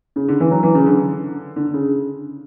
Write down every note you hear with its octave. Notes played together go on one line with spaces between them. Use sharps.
C#3
D3
E3
F#3
E3
C#3
D3
D3
C#3